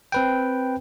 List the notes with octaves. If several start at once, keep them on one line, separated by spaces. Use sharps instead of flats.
C4 B4 G5